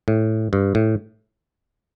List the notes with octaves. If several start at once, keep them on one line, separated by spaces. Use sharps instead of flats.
A2
G2
A2